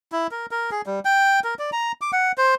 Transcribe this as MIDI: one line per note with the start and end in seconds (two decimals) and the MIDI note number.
0.12 0.27 64
0.31 0.46 70
0.51 0.70 70
0.71 0.82 68
0.86 1.00 55
1.05 1.40 79
1.44 1.54 70
1.59 1.70 74
1.72 1.92 82
2.01 2.11 86
2.13 2.32 78
2.38 2.55 72